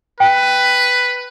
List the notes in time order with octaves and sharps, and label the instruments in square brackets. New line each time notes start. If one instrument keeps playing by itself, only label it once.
[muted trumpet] B4 [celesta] G5